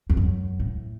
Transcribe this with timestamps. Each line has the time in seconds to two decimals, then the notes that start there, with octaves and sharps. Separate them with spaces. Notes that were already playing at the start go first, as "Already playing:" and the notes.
0.09 E2
0.17 F#2
0.60 A2